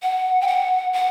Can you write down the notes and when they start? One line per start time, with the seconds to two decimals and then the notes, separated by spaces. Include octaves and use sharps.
0.03 F#5
0.41 G5
0.47 F#5
0.93 F#5